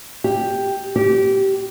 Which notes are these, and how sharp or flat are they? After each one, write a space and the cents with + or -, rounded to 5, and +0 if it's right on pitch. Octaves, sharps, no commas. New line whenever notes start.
G4 +5
G4 -20